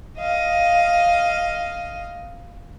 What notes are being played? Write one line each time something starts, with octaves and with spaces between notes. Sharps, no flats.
D#5 F5